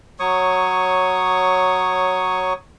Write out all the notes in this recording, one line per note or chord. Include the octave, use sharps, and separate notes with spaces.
F#3 C#5 C#6 D#6